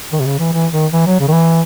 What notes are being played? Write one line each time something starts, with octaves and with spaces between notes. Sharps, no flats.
D#3
C3
C#3
E3
E3
D#3
E3
F#3
C#3
D#3
E3